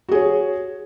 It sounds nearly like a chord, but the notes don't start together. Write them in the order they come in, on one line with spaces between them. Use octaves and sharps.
F#4 G#4 C#5